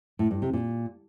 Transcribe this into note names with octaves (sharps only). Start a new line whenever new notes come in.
A2
G2
C3
A#2